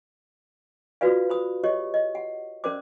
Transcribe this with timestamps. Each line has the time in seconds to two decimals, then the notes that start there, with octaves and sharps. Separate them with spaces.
1.01 F4 F#4 B4 D5 F5
1.30 C5 B5 D#6
1.64 G4 C#5 D#5 C#6
1.94 D#5
2.15 F#5
2.64 C#4 A#4 C5 D5 D6